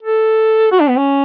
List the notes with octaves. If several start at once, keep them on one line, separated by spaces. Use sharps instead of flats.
A4
F#4
D4
B3
C#4